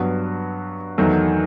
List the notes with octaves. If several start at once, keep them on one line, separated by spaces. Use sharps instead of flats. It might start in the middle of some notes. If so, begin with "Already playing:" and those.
Already playing: G2 F#3 B3 F#4
E2 D#3 F#3 A3